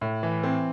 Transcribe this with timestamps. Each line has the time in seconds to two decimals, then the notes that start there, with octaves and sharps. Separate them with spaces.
0.01 A2
0.23 E3
0.43 C4